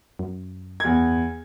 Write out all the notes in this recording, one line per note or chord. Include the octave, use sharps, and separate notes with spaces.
F#2
E2 G#6